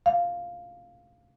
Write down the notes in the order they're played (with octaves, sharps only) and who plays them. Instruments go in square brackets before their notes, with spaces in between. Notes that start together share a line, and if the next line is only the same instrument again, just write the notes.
[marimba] F5